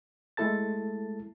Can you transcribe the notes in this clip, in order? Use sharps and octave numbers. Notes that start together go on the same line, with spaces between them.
G#3 A3 E4 A4 A5 A6